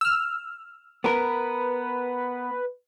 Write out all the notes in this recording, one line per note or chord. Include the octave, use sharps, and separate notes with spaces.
E6 F6
B3 A#4 B4